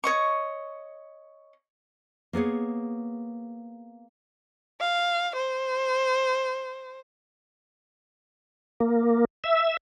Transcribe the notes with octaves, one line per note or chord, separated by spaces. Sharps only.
C#5 D#5 C#6
A#3 B3 G#4 C#5
F5
C5
A#3
E5